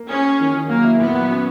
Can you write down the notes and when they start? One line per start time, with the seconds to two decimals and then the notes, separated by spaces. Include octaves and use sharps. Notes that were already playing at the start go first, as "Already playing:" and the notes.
Already playing: A#3
0.09 C#4 G#4
0.25 G#4
0.40 D#3
0.54 D#3
0.69 F#3 A#3
0.84 E4
1.00 A#2 B3
1.15 F#3
1.30 C#4